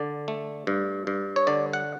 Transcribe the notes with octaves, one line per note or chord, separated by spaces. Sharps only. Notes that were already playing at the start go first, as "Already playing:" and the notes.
Already playing: D3 D5
A3
G2
G2
C#5
D3 D5
F#5